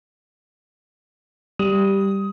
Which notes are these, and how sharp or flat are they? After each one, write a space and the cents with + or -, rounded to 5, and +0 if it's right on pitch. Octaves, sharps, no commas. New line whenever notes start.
G3 +0 D#6 +15